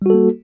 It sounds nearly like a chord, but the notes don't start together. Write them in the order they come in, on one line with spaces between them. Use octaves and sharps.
G3 F#4 A4 A#3